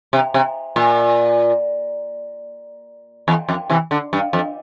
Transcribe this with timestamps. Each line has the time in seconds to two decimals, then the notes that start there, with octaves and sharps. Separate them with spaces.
0.13 C3
0.34 C3
0.76 A#2
3.28 E2
3.49 F2
3.70 C3 E3
3.91 D3
4.13 G2
4.33 F2